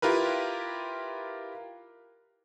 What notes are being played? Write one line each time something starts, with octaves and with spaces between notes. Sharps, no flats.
E4 F4 G4 A#4 B4